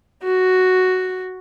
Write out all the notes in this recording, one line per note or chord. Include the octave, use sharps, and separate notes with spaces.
F#4